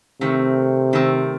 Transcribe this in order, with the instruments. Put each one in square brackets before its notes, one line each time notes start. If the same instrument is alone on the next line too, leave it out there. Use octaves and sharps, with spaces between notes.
[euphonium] C3 [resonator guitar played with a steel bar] D#3 A3 C4
[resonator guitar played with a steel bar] D#3 A3 C4